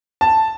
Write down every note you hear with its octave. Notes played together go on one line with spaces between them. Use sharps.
A5